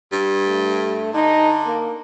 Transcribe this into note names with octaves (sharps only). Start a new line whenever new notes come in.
G2
A3
D3 D#4
A#3